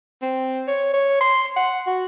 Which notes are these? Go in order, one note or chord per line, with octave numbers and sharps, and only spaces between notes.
C4
C#5
C#5
C6
F#5
F#4